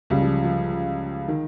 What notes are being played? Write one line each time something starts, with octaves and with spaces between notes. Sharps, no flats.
C#2 C#3 G3
F3
F3
D#3